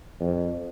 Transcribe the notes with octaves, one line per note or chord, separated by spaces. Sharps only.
F2